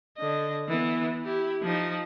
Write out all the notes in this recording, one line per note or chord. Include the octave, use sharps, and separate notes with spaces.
D3 D#5
E3 B3
E4 G4
F3 D#4